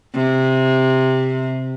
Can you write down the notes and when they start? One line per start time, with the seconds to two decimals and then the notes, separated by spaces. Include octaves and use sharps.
0.15 C3